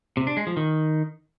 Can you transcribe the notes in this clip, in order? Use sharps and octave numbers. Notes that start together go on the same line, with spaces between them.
C3
D4
G#3
F3
D#3